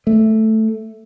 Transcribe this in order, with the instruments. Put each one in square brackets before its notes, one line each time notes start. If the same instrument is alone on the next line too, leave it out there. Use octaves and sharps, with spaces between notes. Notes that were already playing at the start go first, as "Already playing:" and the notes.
[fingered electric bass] A3